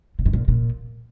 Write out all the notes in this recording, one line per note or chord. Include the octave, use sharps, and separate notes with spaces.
A#2
G#2
A#2
A#2